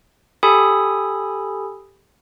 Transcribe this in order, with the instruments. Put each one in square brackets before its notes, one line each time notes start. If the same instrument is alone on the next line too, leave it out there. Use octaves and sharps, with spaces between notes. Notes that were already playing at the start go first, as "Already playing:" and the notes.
[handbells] G4 A4 G#5 B5 D#6